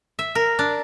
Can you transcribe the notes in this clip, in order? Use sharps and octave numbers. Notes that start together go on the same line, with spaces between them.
E5
A#4
D4